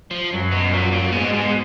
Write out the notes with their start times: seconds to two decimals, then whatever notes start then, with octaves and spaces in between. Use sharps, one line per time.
0.11 F3
0.30 F#2 F#3
0.51 B2
0.71 A#2
0.92 A#2
1.12 G#2 B2 G#3
1.33 B2